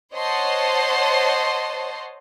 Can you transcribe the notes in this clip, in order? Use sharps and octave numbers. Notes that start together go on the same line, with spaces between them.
C5 C#5 D#5 F#5 A5 C6